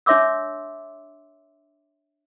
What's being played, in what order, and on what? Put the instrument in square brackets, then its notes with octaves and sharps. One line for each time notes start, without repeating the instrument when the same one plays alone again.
[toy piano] D4 C#5 E5 C6 D6 E6